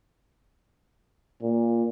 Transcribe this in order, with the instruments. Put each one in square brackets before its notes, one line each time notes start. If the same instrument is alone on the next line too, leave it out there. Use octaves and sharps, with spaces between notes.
[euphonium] A#2